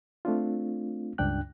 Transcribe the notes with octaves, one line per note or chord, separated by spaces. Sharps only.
A3 C4 D4 F4
C#2 G2 D4 G5 F#6